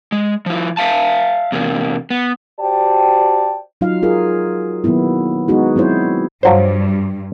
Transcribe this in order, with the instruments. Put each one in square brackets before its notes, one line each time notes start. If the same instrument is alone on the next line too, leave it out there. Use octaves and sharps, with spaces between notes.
[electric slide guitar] G#3
F3 E4
E5 F5 A5
E2 C3 A#3
B3
[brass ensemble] F#4 G4 C5 D5 G5 A5
[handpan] F#3 D#4 F4 F5
F4 G#4 A#4
D#3 F#3 A#3 B3 E4
G#3 B3 D#4 F#4 G#4
F#3 C4 E4 C5 C#5
[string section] G2 [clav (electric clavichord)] F3 F#3 C5